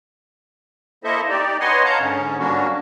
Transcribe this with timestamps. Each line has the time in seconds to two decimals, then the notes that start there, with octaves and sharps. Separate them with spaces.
1.04 A#3 E4 A4 C5 D#5 E5
1.29 D#4 G4 D5
1.60 B4 C#5 D#5 F#5 G#5 C6
1.84 C#5 F5 F#5 A5 A#5
2.00 G#2 D3 C#4
2.39 F#3 G3 A#3 C#4 D4 F#4